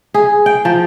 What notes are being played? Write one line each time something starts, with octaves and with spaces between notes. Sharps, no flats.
G#4
G5
F3